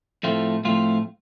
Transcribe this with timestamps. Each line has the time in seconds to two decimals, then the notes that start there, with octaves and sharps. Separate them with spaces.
0.23 A2 F3 A3 C4 F4
0.65 A2 F3 A3 C4 F4